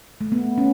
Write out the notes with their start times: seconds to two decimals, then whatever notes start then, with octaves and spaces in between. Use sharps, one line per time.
0.21 A3
0.32 B3
0.58 C#4